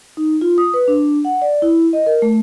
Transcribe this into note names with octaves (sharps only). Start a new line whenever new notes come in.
D#4
F4
D#6
B4
D4
F#5
D5
E4
D#5
A#4
A3